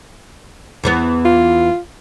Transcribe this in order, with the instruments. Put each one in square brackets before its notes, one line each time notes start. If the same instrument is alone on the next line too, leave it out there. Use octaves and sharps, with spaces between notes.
[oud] E2 E3 B3
[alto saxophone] F4